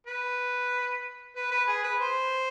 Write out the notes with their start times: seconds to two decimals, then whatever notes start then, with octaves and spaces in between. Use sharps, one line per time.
0.07 B4
1.36 B4
1.51 B4
1.68 G#4
1.84 B4
2.01 C5